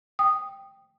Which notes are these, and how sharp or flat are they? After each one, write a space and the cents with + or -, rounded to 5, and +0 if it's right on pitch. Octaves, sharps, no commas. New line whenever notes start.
G5 +0 D#6 -5